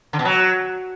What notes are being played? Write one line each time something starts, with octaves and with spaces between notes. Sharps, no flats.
D3
B2
F#3